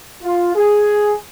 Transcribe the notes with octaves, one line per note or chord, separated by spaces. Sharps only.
F4
G#4